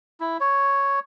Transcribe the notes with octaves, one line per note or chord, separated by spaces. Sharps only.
E4
C#5